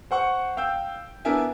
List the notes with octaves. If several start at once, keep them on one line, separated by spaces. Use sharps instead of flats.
C5 F#5 C#6
F5 G5 E6 G6
B3 D4 E4 A#4 E5 G#5